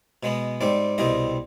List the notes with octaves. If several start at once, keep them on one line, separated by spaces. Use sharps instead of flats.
B2 G#3 B3
G#2 G3 C4 D5
C2 B2 G3 C4 D#5